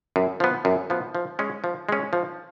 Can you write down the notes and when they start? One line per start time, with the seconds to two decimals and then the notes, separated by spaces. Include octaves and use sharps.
0.16 F#2
0.40 F3 B3
0.65 F#2
0.90 F3 B3
1.15 F3
1.39 G#3 C#4
1.64 F3
1.89 G#3 C#4
2.13 F3